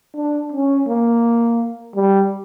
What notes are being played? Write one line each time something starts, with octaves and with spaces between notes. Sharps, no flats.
D4
C#4
A#3
G3